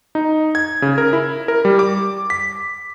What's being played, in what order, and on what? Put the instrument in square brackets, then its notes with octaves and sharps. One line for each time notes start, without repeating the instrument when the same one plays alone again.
[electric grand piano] D#4
G#6
C#3
A#4
E4
A#4
G3
D6
B6